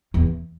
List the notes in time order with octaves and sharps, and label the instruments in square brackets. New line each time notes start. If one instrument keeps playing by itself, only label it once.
[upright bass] E2